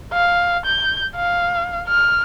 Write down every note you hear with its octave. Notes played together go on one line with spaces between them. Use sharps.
F5
G6
F5
F6